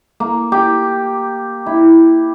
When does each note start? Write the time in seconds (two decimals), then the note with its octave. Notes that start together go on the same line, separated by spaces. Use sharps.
0.20 A#3
0.52 G4
1.66 E4